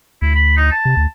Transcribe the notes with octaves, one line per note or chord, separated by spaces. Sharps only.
D2 E4
B5
D#4
A5
C3
D2